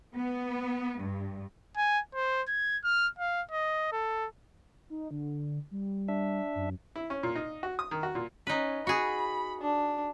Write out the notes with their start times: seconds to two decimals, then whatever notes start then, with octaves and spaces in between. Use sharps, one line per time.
0.14 B3
1.00 G2
1.77 G#5
2.15 C5
2.48 G#6
2.84 F6
3.19 F5
3.51 D#5
3.92 A4
4.90 D#4
5.11 D3
5.71 G3
6.08 D4 E5
6.55 F#2
6.96 E4
7.10 C#4
7.23 A#2
7.35 D#4
7.63 F#4
7.79 D#6
7.91 D#3
8.03 F#4
8.15 A#2
8.47 C#4 D#4 B4
8.87 F#4 G#4 B5
9.61 D4